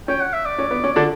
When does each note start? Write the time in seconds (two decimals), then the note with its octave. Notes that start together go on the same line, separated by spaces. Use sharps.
0.08 C#4 G5
0.20 F#5
0.33 E5
0.45 D5
0.58 C#4
0.71 B3
0.84 C#4
0.96 D3 D4